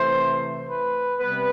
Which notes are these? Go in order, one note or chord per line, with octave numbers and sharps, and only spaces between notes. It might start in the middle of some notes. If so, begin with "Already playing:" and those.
Already playing: C3 E3 A3 C5
B4
C3 G3 B3 B4